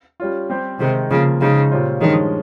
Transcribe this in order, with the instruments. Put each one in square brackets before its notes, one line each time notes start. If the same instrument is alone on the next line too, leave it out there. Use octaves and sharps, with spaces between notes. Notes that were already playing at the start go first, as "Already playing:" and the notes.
[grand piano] G3 C#4 F4
G3 C4 G4 C5
[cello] C3 [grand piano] D#3 G#3 D#4
[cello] C#3 [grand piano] F3 A#3 F4
[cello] C#3 [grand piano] F3 G#3 D#4
[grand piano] A#2 G3 C#4 F4 C5
[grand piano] G2 F3 G#3 C#4 [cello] D#3